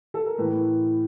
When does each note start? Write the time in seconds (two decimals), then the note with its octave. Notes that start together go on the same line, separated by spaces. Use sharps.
0.14 A4
0.26 A#4
0.38 A2 E3 B4